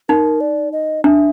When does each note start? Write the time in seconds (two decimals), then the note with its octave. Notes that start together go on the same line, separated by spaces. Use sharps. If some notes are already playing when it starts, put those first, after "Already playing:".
0.09 D#4 A#4
0.41 D5
0.72 D#5
1.04 D4 E5